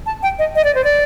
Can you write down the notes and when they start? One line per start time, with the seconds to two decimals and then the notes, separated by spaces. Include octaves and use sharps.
0.06 A5
0.23 G5
0.39 D#5
0.56 D#5
0.64 D5
0.75 C5
0.84 D5